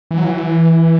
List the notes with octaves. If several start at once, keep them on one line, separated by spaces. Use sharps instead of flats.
E3
F#3
E3